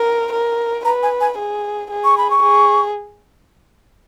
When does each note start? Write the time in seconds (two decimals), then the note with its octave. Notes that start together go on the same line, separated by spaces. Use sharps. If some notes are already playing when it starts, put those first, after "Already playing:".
Already playing: A#4
0.33 A#4
0.85 B4 A#5
1.03 G#5
1.21 G#5
1.38 G#4
1.91 G#4
2.04 C#6
2.18 B5
2.30 C#6
2.43 G#4